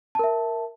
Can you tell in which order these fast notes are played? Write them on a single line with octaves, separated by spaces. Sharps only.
A5 A#4 E5